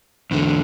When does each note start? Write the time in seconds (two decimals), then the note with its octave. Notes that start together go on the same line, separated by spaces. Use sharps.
0.31 E2 D3